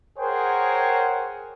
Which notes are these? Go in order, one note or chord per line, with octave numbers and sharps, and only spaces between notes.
G#4 A#4 C5 C#5 F#5 G5